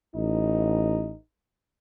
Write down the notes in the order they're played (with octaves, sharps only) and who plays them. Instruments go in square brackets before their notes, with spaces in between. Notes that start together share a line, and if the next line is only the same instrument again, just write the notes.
[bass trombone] A1 [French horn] D#4